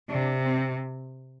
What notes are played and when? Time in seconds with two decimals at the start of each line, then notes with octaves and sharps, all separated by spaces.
0.09 C3 D4
0.45 C4